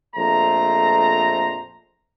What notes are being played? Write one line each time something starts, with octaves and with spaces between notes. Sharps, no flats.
A#1 F2 A3 C5 A#5